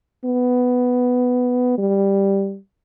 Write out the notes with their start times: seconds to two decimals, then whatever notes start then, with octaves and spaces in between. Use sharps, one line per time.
0.25 B3
1.78 G3